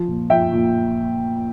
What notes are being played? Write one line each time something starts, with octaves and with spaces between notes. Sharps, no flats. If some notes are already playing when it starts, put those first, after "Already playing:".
Already playing: F3
A#2
F3 E5 G5
A#2